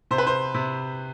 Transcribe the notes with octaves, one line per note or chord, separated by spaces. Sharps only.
C3 C5
B4
C5
C3